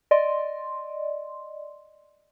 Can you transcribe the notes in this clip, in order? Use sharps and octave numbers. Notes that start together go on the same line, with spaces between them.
D5 D#5 C6